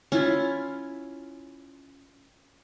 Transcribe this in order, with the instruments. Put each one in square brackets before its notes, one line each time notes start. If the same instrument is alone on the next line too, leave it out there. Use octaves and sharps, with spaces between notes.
[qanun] C#4 E4 F4